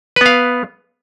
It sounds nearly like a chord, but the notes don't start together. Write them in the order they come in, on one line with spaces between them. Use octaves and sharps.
B4 B3 F5